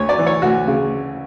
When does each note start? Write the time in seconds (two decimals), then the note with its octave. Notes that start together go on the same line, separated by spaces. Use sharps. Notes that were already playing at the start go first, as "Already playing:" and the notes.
Already playing: D2 C#5
0.09 D5
0.18 E3
0.26 C#5
0.42 D2 F#4
0.67 C#3